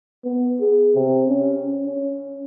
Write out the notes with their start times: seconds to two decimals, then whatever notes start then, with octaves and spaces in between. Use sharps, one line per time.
0.24 B3
0.60 G#4
0.95 C3
1.28 C#4
1.86 C#4